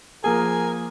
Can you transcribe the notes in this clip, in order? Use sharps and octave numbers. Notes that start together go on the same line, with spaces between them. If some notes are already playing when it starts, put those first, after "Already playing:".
F3 A#3 G#4 A#4 G#5